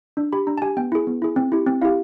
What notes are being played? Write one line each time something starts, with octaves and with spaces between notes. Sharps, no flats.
D4
G4 B5
D4 A#5
A5
G4 G#5
B3 G5
E4 G#4
B3
E4 G#4
C4
E4 G4
C4
E4 G4 F5